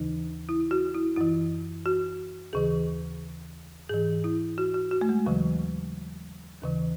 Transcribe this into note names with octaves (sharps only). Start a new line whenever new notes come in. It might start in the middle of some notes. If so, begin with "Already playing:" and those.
Already playing: D#2 C#3 E3 D#4
E4
F#4
E4
F#2 E3 E4
F#4
D#2 C#3 E3 G#4
G#2 E3 G#4
E4
F#4
F#4
F#4
A3
G#3
D#2 C#3 E3 F#3
D#2 C#3 E3